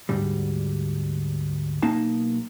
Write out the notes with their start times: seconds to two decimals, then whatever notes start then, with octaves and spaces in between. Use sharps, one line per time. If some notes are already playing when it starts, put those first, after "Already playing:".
0.09 D2 G#2 G3
1.82 B1 A#3 D#4 A5